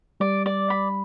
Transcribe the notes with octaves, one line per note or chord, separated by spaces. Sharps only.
G3 D5
D5
B5